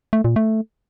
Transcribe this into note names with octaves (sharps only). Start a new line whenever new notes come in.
A3
A#2
A3